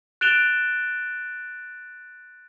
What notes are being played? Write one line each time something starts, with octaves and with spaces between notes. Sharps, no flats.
F#6 A6 D7 E7 F7 G7